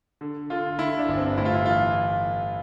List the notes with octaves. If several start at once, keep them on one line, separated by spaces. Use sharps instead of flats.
D3
D3 F4
D3 E4
D4
G1
C4
A2 E4
F4
E4
E3 F4